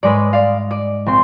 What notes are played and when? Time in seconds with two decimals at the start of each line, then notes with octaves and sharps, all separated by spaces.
0.03 G#2 G#3 B4 C#5 D5 D#6
0.33 D5 F5
0.71 D5
1.06 A#1 C4 C6